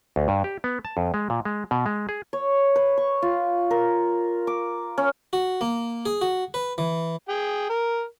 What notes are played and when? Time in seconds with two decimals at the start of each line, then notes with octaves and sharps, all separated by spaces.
0.16 D2
0.28 G2
0.44 G4
0.64 B3
0.85 A5
0.97 F2
1.14 G#3
1.30 A#2
1.45 G#3
1.71 B2
1.86 G#3
2.09 G#4
2.33 C#5
2.76 B4
2.97 C#6
3.22 F4
3.71 A#4
4.47 D6
4.98 C#4
5.33 F#4
5.61 A#3
6.06 G#4
6.21 F#4
6.54 B4
6.78 E3
7.29 G#4 G5
7.70 A#4